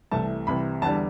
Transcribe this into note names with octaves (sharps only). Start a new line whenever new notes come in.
C2 C3 E3 A3 A5
C2 C3 E3 B5
E2 D3 G3 A5